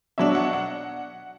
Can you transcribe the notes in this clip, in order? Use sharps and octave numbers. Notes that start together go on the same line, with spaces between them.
B2 F#3 D4 E5
F#5
F#5